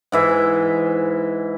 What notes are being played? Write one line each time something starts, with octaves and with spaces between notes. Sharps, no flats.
G#2 E3 E5